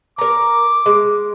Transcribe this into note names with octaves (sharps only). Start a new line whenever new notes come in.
A#4 A#5 D6
G#3